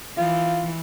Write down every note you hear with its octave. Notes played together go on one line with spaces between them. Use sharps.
E3 F4